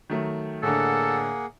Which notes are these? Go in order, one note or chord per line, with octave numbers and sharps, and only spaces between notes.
D#3 F#3 A3
A2 D3 A#3 G#4 A4 F#5